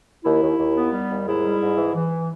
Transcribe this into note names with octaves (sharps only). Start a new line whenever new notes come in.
D#2 E4
D#2
D#2
B3
G3
D#2
G#2 E4 G#4
G3
G#2
E3
E3